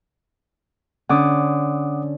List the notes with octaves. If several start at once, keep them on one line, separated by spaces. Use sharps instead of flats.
D3 C#4 F#5 D6 D#6